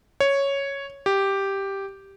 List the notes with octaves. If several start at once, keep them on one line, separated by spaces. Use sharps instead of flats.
C#5
G4